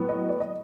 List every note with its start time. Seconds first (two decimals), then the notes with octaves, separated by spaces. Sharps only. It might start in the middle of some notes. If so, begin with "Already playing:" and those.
Already playing: A2 F#3 B3
0.09 D#5
0.29 D5
0.40 D#5